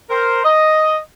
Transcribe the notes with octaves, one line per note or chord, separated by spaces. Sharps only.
A#4 C5
D#5